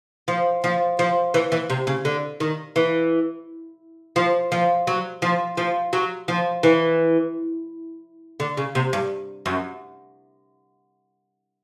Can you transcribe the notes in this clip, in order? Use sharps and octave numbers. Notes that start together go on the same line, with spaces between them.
F3
F3
F3
E3
E3
C3
C#3
D3
D#3
E3
F3
F3
F#3
F3
F3
F#3
F3
E3
D3
C#3
C3
G2
F#2